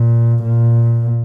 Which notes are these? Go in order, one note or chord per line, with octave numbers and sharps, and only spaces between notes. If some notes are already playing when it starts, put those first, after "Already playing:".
Already playing: A#2
A#2